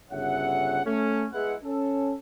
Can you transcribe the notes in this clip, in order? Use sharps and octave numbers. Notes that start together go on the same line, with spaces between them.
G1 C#3 C#5 E5 F#5
A3 C#4
G#3 B3 E4 F#5
C#4 A4